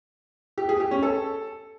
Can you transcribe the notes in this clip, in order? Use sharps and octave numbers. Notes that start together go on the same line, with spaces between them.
G4
G#4
G4
C#4
A4